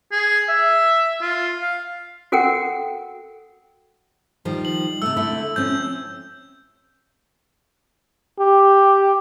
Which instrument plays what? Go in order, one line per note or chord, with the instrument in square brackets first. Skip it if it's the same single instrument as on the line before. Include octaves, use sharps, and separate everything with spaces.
[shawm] G#4
E5
F4
F5
[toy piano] F#4 A4 A#4 F#5 G5
[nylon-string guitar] D#3 F3 G3
[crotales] F#7
[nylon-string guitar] C3 A3 [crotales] E6
[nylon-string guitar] D3 A3 E4
[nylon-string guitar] F3 C4 C#4 [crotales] G6
[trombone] G4